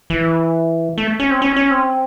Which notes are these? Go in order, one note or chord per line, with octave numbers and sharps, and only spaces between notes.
E3
A3
C#4
C4
C#4
C#4
C4